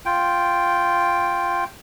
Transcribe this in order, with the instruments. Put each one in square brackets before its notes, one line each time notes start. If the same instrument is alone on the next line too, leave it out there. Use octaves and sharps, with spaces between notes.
[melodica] F4 G5